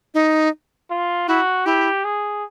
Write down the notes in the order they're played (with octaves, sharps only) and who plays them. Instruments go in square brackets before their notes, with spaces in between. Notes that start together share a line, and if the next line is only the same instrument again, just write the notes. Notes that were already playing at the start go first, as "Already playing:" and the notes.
[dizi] D#4
[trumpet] F4
[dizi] E4 [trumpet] F#4
[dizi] E4 [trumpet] G4
[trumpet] G#4